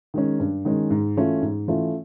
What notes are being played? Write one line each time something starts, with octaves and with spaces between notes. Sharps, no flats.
D#3 G#3 C#4
G2
D#3 G#3 C#4
G#2
E3 A3 C#4 F4
G#2
E3 A3 C#4 F4